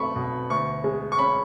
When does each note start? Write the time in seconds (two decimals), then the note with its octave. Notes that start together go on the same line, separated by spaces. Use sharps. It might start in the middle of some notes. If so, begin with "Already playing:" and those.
Already playing: B1 A3 B5 C#6
0.16 B2
0.50 D2 C#6
0.84 G#3
1.12 C#6
1.19 C#4 B5